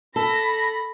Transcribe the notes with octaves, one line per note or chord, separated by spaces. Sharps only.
A4 B5 A#6